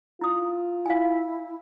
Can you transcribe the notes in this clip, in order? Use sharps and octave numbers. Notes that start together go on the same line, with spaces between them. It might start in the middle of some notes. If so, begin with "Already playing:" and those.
E4 F4 D#6
E4 F5 G#5